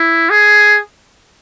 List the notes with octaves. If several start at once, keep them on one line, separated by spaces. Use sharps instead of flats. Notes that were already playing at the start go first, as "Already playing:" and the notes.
Already playing: E4
G#4